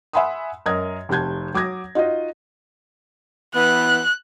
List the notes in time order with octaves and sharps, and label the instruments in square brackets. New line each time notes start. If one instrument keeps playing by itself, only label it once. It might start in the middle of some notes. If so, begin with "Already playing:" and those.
[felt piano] E5 F#5 G#5 B5 C6 D#6
F#2 A#4 D#5 D#6 G#6
F1 C3 A5 G6 G#6
F#3 D6 D#6 G#6 A#6
D#4 F4 F#4 D#5
[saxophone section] E3 B3 [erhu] F#6